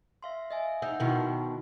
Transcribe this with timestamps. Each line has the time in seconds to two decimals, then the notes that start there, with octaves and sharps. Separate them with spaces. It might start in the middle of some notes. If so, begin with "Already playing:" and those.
0.23 E5 F5 C6
0.51 D#5 E5 G#5
0.82 D#4 F#5 E6 G6
1.00 B2 D#3 D#4 E4 F#4